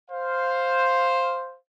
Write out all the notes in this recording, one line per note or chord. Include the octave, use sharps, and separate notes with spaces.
C5 F5